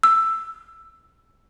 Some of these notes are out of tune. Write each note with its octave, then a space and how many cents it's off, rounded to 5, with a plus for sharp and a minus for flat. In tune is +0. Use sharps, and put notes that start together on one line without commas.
E6 +10